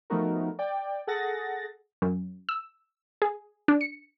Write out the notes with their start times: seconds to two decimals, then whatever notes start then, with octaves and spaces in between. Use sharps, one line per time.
0.10 F3 A3 B3 D#4 F#4 A#4
0.59 D5 G5
1.07 G#4 A4 F#5 A6 A#6
2.02 F#2
2.49 E6
3.22 G#4
3.68 D4
3.81 C#7